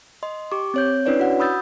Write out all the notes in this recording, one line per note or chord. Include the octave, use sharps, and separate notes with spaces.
D#5 C6
G4 C#6 D6
C4 C#5 G6
C#4 D4 E4 B4 C#5 D5
F#4 F#5
B5 D#6 E6 G6 A6